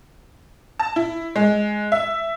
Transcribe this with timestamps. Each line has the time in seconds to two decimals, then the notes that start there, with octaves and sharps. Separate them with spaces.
0.79 A5
0.96 E4
1.36 G#3
1.92 E5